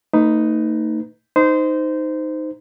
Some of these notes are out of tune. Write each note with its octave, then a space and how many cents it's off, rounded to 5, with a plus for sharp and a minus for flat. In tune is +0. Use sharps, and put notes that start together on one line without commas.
A3 +40 D#4 +0 B4 +15
D#4 +0 C5 -20